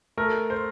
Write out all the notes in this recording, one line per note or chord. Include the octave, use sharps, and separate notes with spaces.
A3 A#4
C5